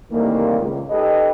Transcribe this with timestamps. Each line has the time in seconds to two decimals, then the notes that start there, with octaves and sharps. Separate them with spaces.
0.11 A2 C3 D#3 E3 G3 A#3
0.60 C#2
0.90 D#4 G4 A4 B4 D#5